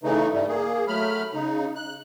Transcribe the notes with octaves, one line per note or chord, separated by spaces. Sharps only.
C#3 E3 A3 D#4
G2 G3 A3
A#3 G#4
F#3 A3 B5 F6
C#3 D#4
F#6